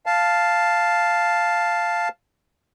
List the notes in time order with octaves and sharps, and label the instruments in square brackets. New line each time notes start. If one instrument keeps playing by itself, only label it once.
[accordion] F5 A5